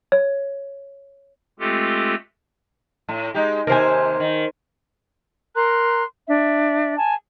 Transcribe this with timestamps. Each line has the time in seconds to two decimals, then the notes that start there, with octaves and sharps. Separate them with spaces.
0.12 C#5
1.60 G#3 A3 C4 F4 G4 A4
3.08 A2
3.34 G#3 D#4 G4
3.67 D#2 C3 G4 A#4 C5 G#5
4.20 D#3
5.55 A#4 A#5 C6 F#6
6.27 D4 E5
6.96 G#5 A5